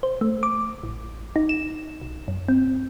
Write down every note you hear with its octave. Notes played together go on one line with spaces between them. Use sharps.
C5
A3
D6
A1
D#4
E7
B1
F#2
C4